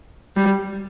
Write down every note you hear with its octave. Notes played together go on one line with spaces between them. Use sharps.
G3